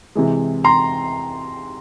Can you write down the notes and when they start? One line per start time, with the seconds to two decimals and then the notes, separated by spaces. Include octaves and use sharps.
0.15 C3 E3 G#3
0.64 A#5 C6